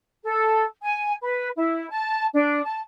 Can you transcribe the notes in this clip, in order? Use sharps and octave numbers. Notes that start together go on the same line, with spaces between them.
A4
G#5
B4
E4
A5
D4
A5